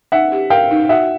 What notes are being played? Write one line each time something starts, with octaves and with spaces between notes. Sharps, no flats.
D#4 E5 F#5
G4
A#4 F5 G5
D#4
F#4 E5 F#5